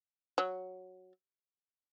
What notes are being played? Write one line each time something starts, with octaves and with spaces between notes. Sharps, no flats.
F#3